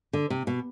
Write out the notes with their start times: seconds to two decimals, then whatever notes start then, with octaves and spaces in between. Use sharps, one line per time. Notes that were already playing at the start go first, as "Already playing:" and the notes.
0.13 D3
0.30 C3
0.47 B2